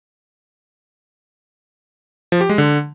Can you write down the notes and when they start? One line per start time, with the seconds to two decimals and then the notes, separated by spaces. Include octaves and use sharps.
2.32 F3
2.41 G4
2.49 G#3
2.58 D3